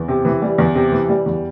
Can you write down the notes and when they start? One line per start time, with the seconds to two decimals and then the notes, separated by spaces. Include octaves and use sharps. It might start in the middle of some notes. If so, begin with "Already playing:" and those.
Already playing: E2
0.08 C3
0.25 E3
0.42 G3
0.58 E2
0.75 C3
0.92 E3
1.09 G3
1.26 E2